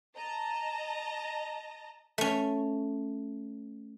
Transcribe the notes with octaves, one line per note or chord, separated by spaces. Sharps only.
D#5 A5 A#5
A3 C#4